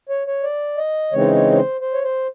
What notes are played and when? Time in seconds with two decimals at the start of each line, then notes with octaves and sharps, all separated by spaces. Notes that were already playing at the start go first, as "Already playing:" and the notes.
0.09 C#5
0.27 C#5
0.43 D5
0.78 D#5
1.13 C#3 E3 G#3 C4 D#4 C#5
1.34 C#5
1.52 C#5
1.57 C5
1.81 C5
1.93 C#5
2.03 C5